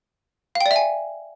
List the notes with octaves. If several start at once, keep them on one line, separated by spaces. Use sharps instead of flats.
F5
G5
D5
E5
G#5